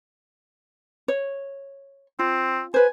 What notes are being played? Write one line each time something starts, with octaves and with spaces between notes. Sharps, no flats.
C#5
C4 F4
B4 C5 G#5